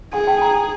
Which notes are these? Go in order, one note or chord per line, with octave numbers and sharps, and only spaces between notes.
G#4 F#5 G#5
G5 A5
G#5 A#5